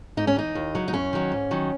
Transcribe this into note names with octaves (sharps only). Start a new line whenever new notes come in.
G#2 D#4
C#4
E3 D#4
D#2
C#3 F#3
D#4
F#2 C#4
D#3 F#3
G#2
D#3 F#3